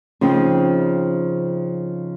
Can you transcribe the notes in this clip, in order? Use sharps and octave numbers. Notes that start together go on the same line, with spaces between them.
C#3 F3 C4 D#4